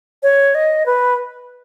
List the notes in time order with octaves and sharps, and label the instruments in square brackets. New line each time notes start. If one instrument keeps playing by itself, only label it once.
[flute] C#5
D#5
B4